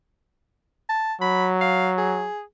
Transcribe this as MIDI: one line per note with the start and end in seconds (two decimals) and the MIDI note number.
0.89 1.13 81
1.21 2.28 54
1.21 1.47 83
1.61 1.90 77
1.98 2.42 68